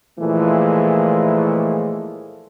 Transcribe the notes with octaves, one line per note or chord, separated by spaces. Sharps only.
A#2 E3 F3 G#3 A3